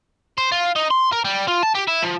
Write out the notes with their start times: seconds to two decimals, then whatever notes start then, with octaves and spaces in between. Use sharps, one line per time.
0.38 C5
0.52 F4
0.76 D#4
0.91 C6
1.13 A#4
1.25 G3
1.48 F4
1.63 A5
1.75 G4
1.87 E4
2.02 F3